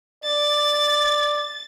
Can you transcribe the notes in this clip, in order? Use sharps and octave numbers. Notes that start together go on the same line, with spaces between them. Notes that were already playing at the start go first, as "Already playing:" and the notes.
D5 A6